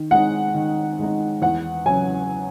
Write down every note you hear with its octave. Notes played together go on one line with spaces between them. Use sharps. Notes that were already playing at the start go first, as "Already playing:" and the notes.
Already playing: D#3
G#3 D#4 F#5
D#3
G#3 D#4
E2 F#5
C#3 F#3 G#5